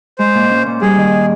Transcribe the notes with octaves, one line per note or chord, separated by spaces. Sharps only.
G#3 C5
A#2
C#4
A#2
G3 G#4
D#3